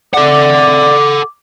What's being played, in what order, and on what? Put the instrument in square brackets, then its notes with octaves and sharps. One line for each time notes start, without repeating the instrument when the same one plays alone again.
[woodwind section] A3 C4 D5 [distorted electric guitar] A4 F#5 [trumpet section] D6